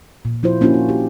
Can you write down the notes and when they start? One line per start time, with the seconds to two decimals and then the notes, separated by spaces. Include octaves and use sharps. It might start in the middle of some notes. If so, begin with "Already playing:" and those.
0.25 A#2
0.43 F3 E4 F4 C5
0.61 A#3 C#4 D4 E4 F#4
0.74 E4
0.89 G4